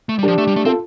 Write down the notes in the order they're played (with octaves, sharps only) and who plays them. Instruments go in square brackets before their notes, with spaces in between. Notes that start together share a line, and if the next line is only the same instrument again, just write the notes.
[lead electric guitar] A3
G3
[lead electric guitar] F3 [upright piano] D4 G4
[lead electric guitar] A3
G3
A3
[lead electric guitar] C4 [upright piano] F4 A4